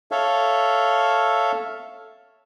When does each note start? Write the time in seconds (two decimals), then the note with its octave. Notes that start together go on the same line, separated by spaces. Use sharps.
0.11 A4 C#5 E5 F5